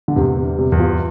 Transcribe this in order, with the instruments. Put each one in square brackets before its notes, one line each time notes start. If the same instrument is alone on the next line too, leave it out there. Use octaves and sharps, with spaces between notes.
[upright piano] D3
[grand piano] E2 [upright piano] C3
[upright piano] C3
[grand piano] G3
[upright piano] C3
[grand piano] E2
[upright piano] F3